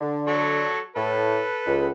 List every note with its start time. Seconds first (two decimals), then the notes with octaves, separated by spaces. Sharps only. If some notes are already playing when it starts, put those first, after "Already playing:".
0.01 D3
0.27 F#3 A4 C#6
0.96 A2 A4 B4
1.66 C#2